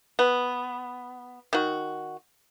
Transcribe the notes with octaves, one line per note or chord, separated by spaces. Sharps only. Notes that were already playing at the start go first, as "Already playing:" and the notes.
B3
D#3 F#4